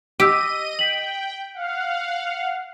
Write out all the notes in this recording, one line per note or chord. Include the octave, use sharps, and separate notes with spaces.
G4 D#5 E6 B6 D#7
G5 B6 F#7
F5 F#5